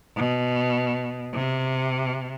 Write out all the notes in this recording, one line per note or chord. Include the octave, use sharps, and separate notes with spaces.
B2
C3